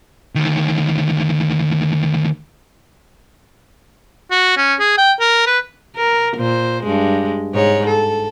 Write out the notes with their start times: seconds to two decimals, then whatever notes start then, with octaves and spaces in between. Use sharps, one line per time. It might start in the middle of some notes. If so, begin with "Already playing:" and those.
0.35 D2 D#3
4.31 F#4
4.57 C#4
4.80 G#4
4.98 G5
5.20 A#4
5.46 B4
5.96 A#4
6.37 A#2 C5
6.84 G2 G#3
7.54 G#2 C#5
7.86 A4